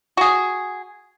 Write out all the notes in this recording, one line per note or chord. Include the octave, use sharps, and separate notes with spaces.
F#4 G#4